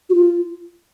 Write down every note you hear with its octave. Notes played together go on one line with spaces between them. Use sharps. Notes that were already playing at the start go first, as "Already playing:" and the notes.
F#4
F4